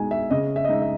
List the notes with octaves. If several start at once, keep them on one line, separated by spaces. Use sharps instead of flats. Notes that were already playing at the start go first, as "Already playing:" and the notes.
Already playing: B2 G#3 D#4 G#5
E5
C#3 D#5
E5
D#5
G#3 D#4 E5
E5